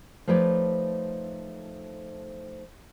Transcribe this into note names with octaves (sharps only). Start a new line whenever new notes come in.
F3 A3 D#4 B4 C#5 D5